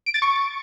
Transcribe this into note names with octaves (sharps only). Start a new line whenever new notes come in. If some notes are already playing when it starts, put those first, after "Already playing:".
D7
A6
C#6